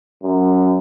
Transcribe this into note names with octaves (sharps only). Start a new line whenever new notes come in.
F#2